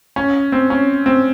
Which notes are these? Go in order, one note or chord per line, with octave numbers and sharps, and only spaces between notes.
C#4
C4
C#4
C4